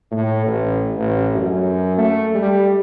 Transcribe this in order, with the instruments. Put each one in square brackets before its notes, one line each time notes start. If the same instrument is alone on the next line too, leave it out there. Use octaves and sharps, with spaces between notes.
[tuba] A2
A1
A1
F#2
A3
G3